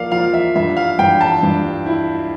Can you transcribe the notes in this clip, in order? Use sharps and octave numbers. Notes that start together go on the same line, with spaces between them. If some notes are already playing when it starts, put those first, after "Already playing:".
Already playing: F3 A#3 D5 F5
F3 F5
E5
G2 E5
F5
G2 G5
A5
G2
E4